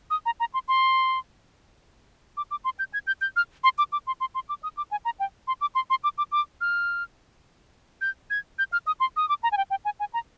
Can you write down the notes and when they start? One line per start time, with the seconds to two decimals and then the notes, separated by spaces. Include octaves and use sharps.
0.10 D#6
0.26 A#5
0.40 A#5
0.54 C6
0.68 C6
2.37 D6
2.51 D6
2.65 C6
2.79 G6
2.94 G#6
3.07 G6
3.21 G6
3.36 F6
3.64 C6
3.78 D6
3.92 D6
4.07 C6
4.20 C6
4.35 C6
4.49 D6
4.63 D#6
4.77 D6
4.91 G#5
5.05 A#5
5.20 G5
5.48 C6
5.61 D6
5.75 C6
5.90 C6
6.04 D6
6.18 D6
6.32 D6
6.61 F6
8.01 G6
8.30 G#6
8.59 G6
8.72 F6
8.87 D#6
9.00 C6
9.16 D#6
9.29 D6
9.43 A#5
9.52 G#5
9.57 G5
9.70 G5
9.85 G#5
10.00 G#5
10.14 A#5